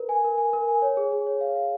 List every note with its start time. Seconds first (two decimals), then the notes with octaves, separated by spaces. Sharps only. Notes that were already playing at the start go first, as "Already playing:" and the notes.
Already playing: A#4 B4
0.09 G#5
0.24 A#4
0.38 G#5
0.53 A#4
0.68 G#5
0.82 C#5
0.97 G#4
1.12 G#4
1.27 C#5
1.41 F5
1.55 F5